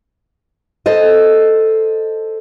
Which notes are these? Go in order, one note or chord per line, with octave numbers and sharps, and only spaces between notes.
A4 C5 D#5